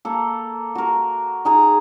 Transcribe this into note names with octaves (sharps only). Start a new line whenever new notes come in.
A#3 A4
F#4 A#4
D#4 G#4 A#5